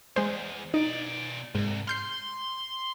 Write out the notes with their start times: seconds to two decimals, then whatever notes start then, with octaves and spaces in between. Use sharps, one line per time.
0.16 E2 G#3 C5
0.74 B2 D#4 D5
1.55 C2 G#2
1.88 C6 F6 G6 C7